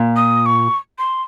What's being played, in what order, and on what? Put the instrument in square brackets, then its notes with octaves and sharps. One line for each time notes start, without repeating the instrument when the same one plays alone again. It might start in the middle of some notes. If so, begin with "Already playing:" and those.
Already playing: [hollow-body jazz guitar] A#2
[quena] D#6
C#6
C6